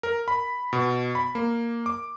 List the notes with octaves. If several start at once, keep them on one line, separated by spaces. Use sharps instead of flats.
A#4
B5
B2
B5
A#3
D6